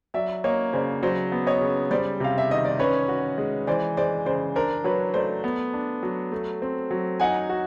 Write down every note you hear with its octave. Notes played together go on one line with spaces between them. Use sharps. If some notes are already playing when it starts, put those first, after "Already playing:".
F#3 D5 E5
A#3 C#5 D#5
C#3 C5 D5
F#3 C5 D5
B3
C#5 D#5
C#3
G3 C5 D5
C3 F5
E5
D#3 D#5
D5
C#4 B4 C#5
F#4
G#3
E3 C5 D5
G#3 C5 D5
C#3 C5 D5
D4 A#4 C5
F#3 B4 C#5
A3 C5 D5
B3
D4
F#3
A3
C4
F#3
D#4 F#5 G#5
F#4